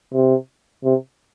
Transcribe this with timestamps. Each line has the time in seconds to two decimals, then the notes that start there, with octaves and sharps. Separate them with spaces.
0.14 C3
0.84 C3